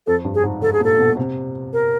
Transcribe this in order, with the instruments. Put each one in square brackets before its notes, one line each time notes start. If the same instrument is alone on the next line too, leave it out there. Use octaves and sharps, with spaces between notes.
[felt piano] F2 [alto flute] A4
[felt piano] G2
[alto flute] G#4
[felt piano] G#2
[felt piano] G#2 [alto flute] A4
[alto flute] G#4
[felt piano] A#2
[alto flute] A4
[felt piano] B2
C3
[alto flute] A#4